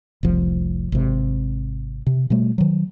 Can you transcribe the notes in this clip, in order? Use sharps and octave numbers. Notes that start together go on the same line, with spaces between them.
F1 C2 F3
G#1 C3
C3
B2 G3 A3
D#3 F#3